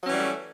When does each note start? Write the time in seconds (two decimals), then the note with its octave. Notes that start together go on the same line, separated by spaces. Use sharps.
0.03 F#3
0.07 C#4
0.10 E3
0.13 G3
0.16 A3